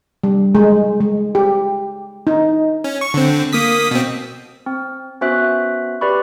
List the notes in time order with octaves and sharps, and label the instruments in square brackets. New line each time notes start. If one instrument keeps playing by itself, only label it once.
[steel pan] G3
G#3
G#3
G4
D#4
[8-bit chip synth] C#4
C#6
D3 C4
A#3 D#6 B6
B2 C4
[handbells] C4
B3 C#4 F#4 C5 E5 F#6
G4 B4 D5 B5 C#6